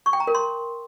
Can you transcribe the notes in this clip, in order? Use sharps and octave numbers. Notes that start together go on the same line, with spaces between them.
C#6
G5
A#5
A#4
C6